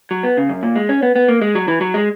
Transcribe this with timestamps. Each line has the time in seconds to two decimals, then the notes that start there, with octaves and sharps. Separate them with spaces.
0.11 F#3
0.23 B3
0.37 C#3
0.49 F#2
0.63 A#2
0.76 G#3
0.89 C#4
1.03 B3
1.16 B3
1.28 A#3
1.42 G#3
1.55 F#3
1.68 E3
1.81 F#3
1.94 G#3